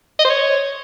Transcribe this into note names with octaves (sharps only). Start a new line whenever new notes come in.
D#5
C5
C#5